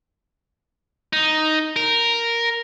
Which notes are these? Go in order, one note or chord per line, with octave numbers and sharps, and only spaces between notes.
D#4
A#4